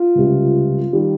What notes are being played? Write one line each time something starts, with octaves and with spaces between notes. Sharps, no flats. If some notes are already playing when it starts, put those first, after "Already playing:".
Already playing: F4
C#2 C3 G3
D#3 G3